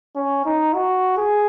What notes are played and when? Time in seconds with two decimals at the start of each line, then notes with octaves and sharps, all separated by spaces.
0.15 C#4
0.45 D#4
0.74 F#4
1.17 G#4